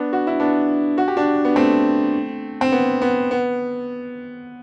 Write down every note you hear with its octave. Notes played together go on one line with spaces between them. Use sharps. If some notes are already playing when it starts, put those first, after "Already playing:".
Already playing: B3 D4
F#4
E4
B3 D4
F#4
G4
D4 F#4
B3
A3 C4
C4
B3
B3
B3